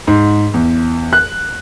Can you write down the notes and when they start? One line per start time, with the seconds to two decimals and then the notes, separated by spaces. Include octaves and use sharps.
0.07 G#2
0.54 E2
1.13 F#6